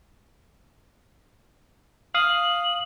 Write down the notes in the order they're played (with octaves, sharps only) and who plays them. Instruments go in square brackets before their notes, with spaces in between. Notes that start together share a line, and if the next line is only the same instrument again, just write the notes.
[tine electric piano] F5 D#6 [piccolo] F#7